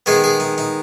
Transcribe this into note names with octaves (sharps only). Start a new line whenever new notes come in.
D#3 G#3 B3 G#4
G#4
D#4
D#4